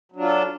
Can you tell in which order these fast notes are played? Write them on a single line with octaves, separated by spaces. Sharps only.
F#3 D4 F4 A4